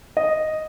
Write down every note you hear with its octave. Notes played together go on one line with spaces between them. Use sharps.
D#5